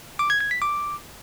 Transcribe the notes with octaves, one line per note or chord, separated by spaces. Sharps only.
D6
G#6
G#6
B6
D6